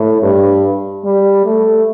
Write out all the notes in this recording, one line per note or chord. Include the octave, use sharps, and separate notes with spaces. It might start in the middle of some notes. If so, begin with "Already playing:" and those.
Already playing: A2
G2
G3
A3